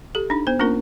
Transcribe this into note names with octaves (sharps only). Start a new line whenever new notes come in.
G4 A4
D4 D#4
B3 C5
A#3 C#4 D4 F4 A#4